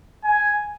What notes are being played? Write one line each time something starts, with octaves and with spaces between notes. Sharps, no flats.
G#5